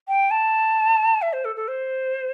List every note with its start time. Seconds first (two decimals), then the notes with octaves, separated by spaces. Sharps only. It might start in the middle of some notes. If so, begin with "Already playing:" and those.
0.08 G5
0.31 A5
1.22 E5
1.33 C5
1.45 A4
1.56 A4
1.68 C5